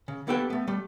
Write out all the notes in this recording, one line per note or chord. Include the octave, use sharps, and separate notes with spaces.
C#3
A#3 B3 G4 A4 B4 G5
A3 B3
G3 A3